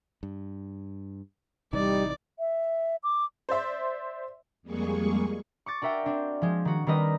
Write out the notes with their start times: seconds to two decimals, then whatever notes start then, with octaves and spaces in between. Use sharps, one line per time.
0.23 G2
1.73 A1 C3 E3 G3 D#4 D5
2.39 E5
3.03 D6
3.49 C5 D5 E5 C6
4.63 F2 G3 G#3 A#3 G#4 C#6
5.66 C#6 D6 A6
5.82 D4 F#4 A#4 E5 G5
6.06 C4 D4
6.42 F3 G#3
6.65 D#3 F#4
6.87 D#3 G3 C4 A#4 B4 D#5